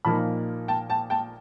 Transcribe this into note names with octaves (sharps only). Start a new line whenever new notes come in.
A#2 F3 A#3 D#4 A5 B5
G5 A5
G5 A5
G5 A5